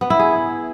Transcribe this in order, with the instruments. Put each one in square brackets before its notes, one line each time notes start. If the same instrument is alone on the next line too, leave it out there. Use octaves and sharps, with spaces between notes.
[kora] B3
E4
G#4